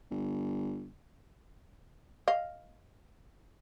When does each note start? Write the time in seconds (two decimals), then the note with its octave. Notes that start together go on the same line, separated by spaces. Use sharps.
0.11 G1
2.28 D#5 F5